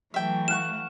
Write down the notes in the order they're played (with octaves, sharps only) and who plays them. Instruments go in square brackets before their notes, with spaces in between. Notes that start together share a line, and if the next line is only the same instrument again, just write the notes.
[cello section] E3 F#3 A3 [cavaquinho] E5 G5
[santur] F5 F#5 C#6 [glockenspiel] E7